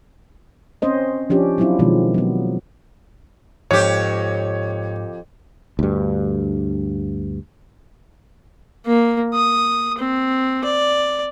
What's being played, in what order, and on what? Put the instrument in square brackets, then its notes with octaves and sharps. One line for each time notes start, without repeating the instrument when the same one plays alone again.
[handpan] C4 C#4 C5 D#5
F3 C#4 D4 G4
F#3 C4 D4 E4 F4
B2 D#3 F3 G#3 C4
F#3 B3
[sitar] F2 G4 [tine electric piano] G#2 [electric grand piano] C#5
[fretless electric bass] D2 G2
[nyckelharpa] A#3
D#6
C4
D5